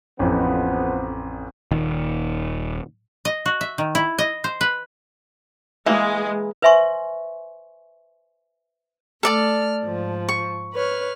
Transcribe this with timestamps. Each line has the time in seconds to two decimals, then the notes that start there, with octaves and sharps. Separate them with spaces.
0.19 A1 F2 F3 B3
1.71 D#1 D#3
3.25 D#5
3.46 F#4
3.61 E5
3.78 D#3
3.95 E4
4.19 D#5
4.44 C5
4.61 B4
5.86 E3 G#3 A#3
6.62 B4 C5 E5 G#5 C6 C#6
9.23 A3 A4 D5 A5 F6
9.84 G#2 F3
10.29 C#6
10.73 B4 C#5 F6